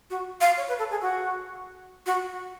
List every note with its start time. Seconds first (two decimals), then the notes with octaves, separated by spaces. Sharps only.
0.10 F#4
0.41 F5
0.57 C#5
0.68 B4
0.79 A4
0.91 G#4
1.02 F#4
2.06 F#4